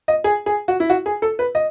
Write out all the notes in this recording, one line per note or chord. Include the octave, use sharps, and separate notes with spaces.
D#5
G#4
G#4
F#4
E4
F#4
G#4
A4
B4
D#5